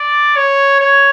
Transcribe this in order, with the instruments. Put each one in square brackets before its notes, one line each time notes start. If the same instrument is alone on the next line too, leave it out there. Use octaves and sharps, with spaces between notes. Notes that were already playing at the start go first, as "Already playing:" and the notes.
Already playing: [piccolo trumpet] D5
C#5
C#5